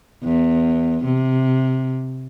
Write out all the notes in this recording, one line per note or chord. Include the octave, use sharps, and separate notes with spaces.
E2
C3